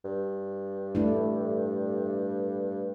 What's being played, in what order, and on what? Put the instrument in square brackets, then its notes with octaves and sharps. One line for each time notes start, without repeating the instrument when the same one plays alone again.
[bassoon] G2
[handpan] A3 D4 E4